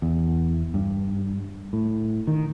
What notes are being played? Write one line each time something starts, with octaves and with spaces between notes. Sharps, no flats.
E2
G2
A2
D#3